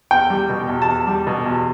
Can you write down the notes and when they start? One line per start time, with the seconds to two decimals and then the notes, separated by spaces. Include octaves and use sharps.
0.11 E2 G5
0.30 G3
0.50 B2
0.69 E2
0.82 A5
0.88 E2
1.07 G3
1.27 B2
1.46 E2